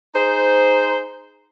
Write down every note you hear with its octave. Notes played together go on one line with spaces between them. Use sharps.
D#4 G#4 C5